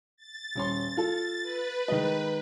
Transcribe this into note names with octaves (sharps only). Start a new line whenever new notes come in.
A6
D#1 C#4 C6
F4 A4
B4
D#3 G#3 D#5